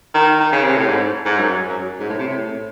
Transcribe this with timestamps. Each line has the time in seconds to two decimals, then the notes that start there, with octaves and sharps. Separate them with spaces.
0.14 D#3
0.40 D#3
0.52 C#3
0.64 C3
0.76 A2
0.88 G#2
1.25 G#2
1.39 F#2
1.67 F#2
1.99 G#2
2.09 A2
2.18 C3
2.27 A2